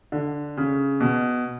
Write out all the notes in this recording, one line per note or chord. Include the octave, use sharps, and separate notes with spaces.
D3
C#3
B2